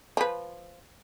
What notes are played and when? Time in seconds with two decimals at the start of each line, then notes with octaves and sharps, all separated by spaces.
0.17 F3 B4